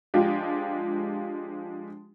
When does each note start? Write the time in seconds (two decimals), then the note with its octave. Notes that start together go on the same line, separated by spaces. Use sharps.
0.14 F3 G#3 D4 F4 G4